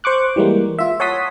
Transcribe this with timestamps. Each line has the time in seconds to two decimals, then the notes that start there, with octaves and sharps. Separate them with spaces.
0.04 C5 C#6 D6 F#6
0.36 E3 G3 G#3 A#3
0.79 F4 E5
1.00 C#5 F#5 A5 C6 D#6 B6